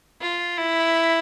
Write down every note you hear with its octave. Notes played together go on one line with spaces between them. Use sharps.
F4
E4